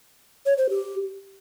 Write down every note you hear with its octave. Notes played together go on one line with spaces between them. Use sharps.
C#5
C5
G4